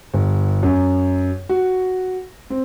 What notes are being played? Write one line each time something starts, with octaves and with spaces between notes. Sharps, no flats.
G1
F#2
F#4
C4